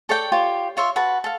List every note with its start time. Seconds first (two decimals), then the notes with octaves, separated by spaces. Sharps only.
0.09 A4 C#5 D5 G5
0.32 F4 G4 C#5
0.77 F4 C#5 E5 C6
0.96 F#4 B4 A5
1.24 A4 F5